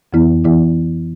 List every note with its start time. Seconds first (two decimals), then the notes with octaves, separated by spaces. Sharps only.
0.13 F2 E3 B3 E4
0.45 E3 B3 E4